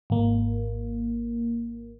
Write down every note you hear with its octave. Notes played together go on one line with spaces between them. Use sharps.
G#1 A#3